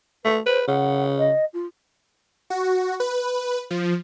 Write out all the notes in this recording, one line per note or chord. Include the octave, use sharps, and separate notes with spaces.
A3 B4
B4 C5
C#3 F#5
D#5
F4
F#4
B4
F3